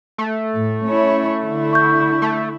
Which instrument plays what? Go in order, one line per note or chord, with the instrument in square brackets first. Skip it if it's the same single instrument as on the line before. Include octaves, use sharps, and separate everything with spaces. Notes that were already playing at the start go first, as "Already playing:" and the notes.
[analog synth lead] A3
[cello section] A2
C#4 E4 C#5
D3 E4
[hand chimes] C#6 G6
[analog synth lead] A3